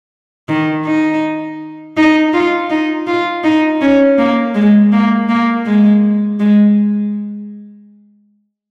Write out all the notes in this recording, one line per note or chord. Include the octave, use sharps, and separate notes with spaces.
D#3
D#4
D#4
F4
D#4
F4
D#4
C#4
A#3
G#3
A#3
A#3
G#3
G#3